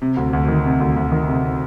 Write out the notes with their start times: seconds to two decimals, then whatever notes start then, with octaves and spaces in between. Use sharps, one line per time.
0.02 C3
0.17 D2
0.33 D2
0.48 D#3
0.65 C3
0.80 D2
0.96 D2
1.12 D#3
1.28 C3